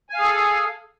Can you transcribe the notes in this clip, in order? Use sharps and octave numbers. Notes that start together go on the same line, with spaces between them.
G#4 A4 F5 G#5